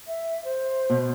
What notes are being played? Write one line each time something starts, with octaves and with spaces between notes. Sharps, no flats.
E5
C5
B2